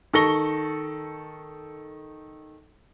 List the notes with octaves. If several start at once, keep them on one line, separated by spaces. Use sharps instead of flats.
D#3 A4 C#6 A#6 G7